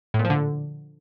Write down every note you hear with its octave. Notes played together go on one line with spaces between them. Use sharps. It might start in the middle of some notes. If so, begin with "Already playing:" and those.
A2
A#2
F3
D3